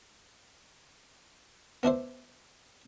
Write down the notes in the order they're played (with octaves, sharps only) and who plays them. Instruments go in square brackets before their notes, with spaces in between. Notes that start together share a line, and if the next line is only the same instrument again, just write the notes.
[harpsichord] B3 D4 E4 C5